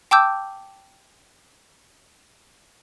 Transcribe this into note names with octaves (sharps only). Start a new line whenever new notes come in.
G5 A5 D6 E6 G6